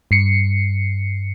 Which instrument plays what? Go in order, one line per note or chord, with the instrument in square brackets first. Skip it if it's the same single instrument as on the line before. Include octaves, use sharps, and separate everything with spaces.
[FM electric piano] G2 C7 C#7